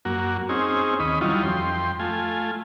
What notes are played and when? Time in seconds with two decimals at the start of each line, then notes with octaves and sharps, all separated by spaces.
0.05 F#2 A#3 F#4
0.49 C4 C#4 D#4 G#4
1.00 D#2 C#4 D#5 B5
1.21 E3 F#3 G3 C#4 D#4 F4
1.43 F2 G5 C6
1.99 A3 F4 G#5